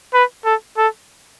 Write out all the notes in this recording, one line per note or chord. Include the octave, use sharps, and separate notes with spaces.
B4
A4
A4